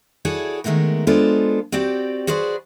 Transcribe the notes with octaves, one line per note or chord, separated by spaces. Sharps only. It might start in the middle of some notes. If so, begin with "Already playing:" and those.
E4 F#4 G#4 A4 C#5 D5
D#3 G#3 A3 B3 A#4
G#3 B3 D4 F4 A4 C5
C4 F#4 G4 D5 G5
F#4 G#4 B4 C5 D5